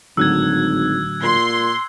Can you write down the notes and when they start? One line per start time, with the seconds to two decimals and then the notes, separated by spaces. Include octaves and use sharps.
0.17 G#1 A2 D3 F#3 E6 F#6 G#6
1.23 A#2 C6